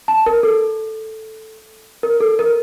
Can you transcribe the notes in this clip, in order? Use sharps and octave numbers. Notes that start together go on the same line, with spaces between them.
A5
A#4
A4
A#4
A4
A#4